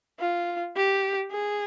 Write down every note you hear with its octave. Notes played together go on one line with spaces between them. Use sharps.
F4
G4
G#4